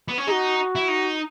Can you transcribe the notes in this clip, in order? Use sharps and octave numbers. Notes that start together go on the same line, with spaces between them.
B3
C#4
D#4 F#4 G#4
E4
D#4